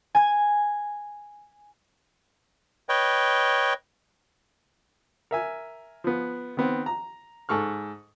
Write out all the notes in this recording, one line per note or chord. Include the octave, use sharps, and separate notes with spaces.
G#5 G#6
B4 C#5 D#5 G5
A#4 E5 G#5
F3 B3
D#3 B3 C4
A#5
G#2 A4 C#6 F6